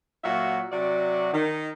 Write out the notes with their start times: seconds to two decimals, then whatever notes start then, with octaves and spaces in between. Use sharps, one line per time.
0.24 A#2 F#3 F#4 E5 F5
0.72 C3 F#3 F#4 D5
1.34 D#3